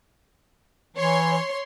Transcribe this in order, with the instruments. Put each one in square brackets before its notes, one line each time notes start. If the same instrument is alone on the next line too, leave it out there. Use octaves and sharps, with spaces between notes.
[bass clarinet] E3 [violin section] C#5 C6